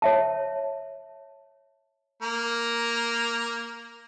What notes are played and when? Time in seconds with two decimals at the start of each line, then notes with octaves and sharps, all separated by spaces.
0.02 C#5 E5 A5
2.22 A#3 A#5